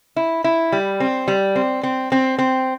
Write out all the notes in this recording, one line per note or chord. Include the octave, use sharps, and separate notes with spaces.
E4
E4
G3
C4
G3
C4
C4
C4
C4